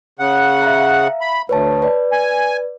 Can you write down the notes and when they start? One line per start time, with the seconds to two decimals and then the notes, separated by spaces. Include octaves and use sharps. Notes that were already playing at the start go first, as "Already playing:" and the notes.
0.19 C#3 F#5
0.62 E5 F5 A#5
1.21 B5
1.49 D2 B4 C#5 A5
1.82 B4 D5
2.12 G#5